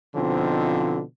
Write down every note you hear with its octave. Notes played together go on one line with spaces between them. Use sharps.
B2 D3 F3 C4 D#4 F4